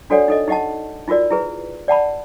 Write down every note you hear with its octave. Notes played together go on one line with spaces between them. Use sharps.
D4 F#4 A4 C#5 D5 F#5
D#4 A4 D#5
D#4 G4 D#5 F#5 A5
D#4 F4 F#4 A#4 D5
E4 G#4 B4
D5 F#5 A5 B5